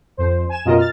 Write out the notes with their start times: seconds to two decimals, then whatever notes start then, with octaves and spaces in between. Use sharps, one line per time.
0.17 F2 C5
0.49 G#5 E7
0.65 F#2 B2 F4 A#4 D#5
0.77 F6 A6